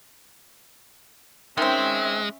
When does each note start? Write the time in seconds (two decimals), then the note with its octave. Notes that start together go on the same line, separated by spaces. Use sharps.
1.57 D#3 G#3 C4 C#4 E5